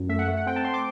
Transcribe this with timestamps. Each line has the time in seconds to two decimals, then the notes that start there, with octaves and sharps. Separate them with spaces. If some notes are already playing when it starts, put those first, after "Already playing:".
Already playing: F#2
0.09 A3 E5
0.19 F#5
0.28 A3
0.37 F#5
0.46 C4 G5
0.56 A5
0.64 C4 C6
0.74 D6